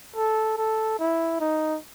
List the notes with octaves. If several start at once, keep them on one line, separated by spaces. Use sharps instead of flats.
A4
A4
E4
D#4